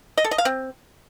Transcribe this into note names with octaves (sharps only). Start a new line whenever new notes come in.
D#5
A4
D#5
F5
C4